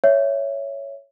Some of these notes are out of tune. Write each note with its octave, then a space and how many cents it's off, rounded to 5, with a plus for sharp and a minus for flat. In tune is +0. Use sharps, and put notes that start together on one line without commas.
C#5 +5 E5 +5